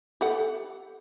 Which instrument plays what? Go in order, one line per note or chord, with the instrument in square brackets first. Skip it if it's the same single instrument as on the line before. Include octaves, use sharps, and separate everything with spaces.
[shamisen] G4 A4 F#5